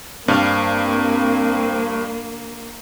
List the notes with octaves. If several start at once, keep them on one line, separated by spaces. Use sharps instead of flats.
G2 A#3 C4 D4 F5